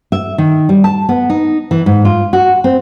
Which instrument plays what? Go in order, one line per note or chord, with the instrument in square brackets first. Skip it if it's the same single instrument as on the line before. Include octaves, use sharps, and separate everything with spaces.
[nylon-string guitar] E5
D#3
G3
A5
B3
D#4
E3
G#2
F4
F#4
C4